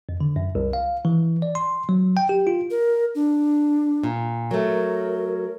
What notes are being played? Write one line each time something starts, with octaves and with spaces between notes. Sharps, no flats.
F2
D3
F#2
C2
F5
E3
D5
C6
F#3
G5
G4
F4
A#4
D4
A#2
F#3 A3 A#4